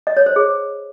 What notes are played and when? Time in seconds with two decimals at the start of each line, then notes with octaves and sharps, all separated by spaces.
0.07 D#5
0.17 C#5
0.26 C5
0.36 G#4